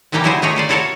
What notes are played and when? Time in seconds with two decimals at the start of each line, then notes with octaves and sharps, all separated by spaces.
0.12 C3 E3 G3 A#3 G4 G5
0.24 D3 F#3 G3 E4 G#4 C5
0.42 D#3 A3 D#4 G4 G#4 C#5
0.56 F4 C5 D5
0.69 E4 F#4 A4 A#4 C#5 A5